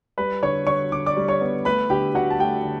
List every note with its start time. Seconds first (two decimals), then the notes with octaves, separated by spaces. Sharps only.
0.18 G3 B4 B5
0.43 D3 C#5 C#6
0.67 D3 C#5 C#6
0.92 D3 D6
1.06 D5 D6
1.17 G3
1.28 C#5 C#6
1.41 B3
1.65 A3 B4 B5
1.90 D3 G4 G5
2.15 D3 F#4 F#5
2.30 A5
2.39 A3 G4 G5
2.65 D3